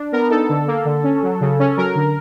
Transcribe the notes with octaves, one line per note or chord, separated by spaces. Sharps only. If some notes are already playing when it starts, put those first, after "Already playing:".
Already playing: D4
B3 A#4
D#4 A4
D3
A#3
D3
C#4
F#3
C#3
C#4
F#3 A#4
D3